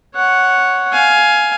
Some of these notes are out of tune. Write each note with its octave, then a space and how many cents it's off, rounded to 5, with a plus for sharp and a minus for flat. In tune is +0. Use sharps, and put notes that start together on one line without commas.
C#5 +0 F#5 +0
F5 +0 G#5 +15